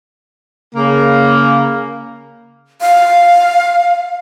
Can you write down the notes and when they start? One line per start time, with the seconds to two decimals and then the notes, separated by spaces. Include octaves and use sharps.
0.75 C#3 A#3
2.81 F5